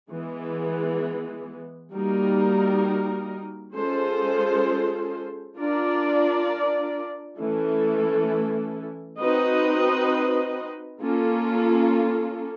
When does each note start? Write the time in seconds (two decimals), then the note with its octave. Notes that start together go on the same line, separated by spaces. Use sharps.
0.11 E3 G#3 B3
1.93 G3 A#3 D#4 F#4 A#4
3.75 G#3 C#4 F4 A4 C5
5.57 D4 F4 A#4 D5
7.38 E3 A3 C#4 E4 A4
9.19 C4 D#4 F#4 B4 D#5
11.01 A#3 C#4 F4 A4